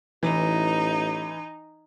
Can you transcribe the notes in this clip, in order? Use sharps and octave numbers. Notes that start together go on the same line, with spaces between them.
A1 E3 D#4